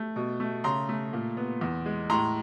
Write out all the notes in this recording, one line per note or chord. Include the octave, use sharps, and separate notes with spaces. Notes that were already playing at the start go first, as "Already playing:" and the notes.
Already playing: A3
B2
A3
C#3 A#5 C6
A3
A#2
B3
E2
G#3
A2 A#5 C6